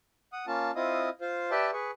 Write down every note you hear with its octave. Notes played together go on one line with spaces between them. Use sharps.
F#5 D#6
A#3 C#4 F4 A5
C4 E4 F4 D#5 D#6
F4 C5
G4 B4 D5 E5 G5 A5
G#4 B4 C#6